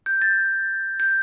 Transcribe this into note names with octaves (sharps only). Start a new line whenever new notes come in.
G6
A6
G6